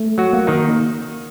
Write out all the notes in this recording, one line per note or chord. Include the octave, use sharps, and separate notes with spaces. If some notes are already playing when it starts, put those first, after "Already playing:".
Already playing: A3
F#3 F#4
A#3
D#3 D#4